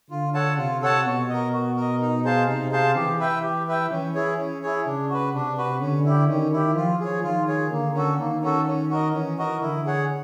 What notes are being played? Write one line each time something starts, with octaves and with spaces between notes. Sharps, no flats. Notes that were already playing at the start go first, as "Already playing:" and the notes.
D3 F4
A4 C#5 F#5 A5
C3 F4
A4 C#5 F#5 A5
B2 F#4
A#4 D#5
F#4
A#4 D#5
D#4
G#4 C5 F5 A5
C3 D#4
G#4 C5 F5 A5
E3 G4
B4 E5 G5
G4
B4 E5 G5
E3 C#4
E4 G#4 C#5
C#4
E4 G#4 C#5
C#3 D4
F#4 B4
C3 D4
F#4 B4
D3 C#4
E4 G4
D#3 C#4
E4 G4
F3 F4
G#4 C#5
D#3 F4
G#4 C#5
D3 A#3
C#4 F#4 A4
D#3 A#3
C#4 F#4 A4
C#4
F#4 A#4 D#5
E3 C#4
F#4 A#4 D#5
D3 E4
G#4 C#5 F#5